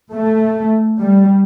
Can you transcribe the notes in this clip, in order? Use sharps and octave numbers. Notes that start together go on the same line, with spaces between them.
A3
G3